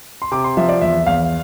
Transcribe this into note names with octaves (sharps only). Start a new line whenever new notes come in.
C6
C3 D6
C6
F3 E5
D5
E2 E5
E2 F5